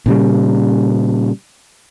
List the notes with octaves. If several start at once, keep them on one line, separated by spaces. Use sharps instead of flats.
A#2 C#3 G3